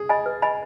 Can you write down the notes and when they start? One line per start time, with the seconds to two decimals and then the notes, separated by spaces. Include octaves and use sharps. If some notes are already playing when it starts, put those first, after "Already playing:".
Already playing: G#4
0.09 D#5 G#5 B5
0.26 B4
0.42 D#5 G#5 B5